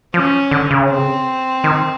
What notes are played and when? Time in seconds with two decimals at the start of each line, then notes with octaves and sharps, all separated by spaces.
0.14 F3 C#4
0.51 D3
0.71 C#3
0.90 C4
1.64 D#3